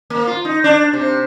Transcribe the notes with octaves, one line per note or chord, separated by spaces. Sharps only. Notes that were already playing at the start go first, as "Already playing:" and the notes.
A#3
F4
D#4
D4
C3